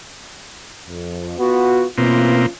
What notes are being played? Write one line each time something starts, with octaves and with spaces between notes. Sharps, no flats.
F2
B3 F4 F#4
B2 E3 A#3 C4 C#4 F4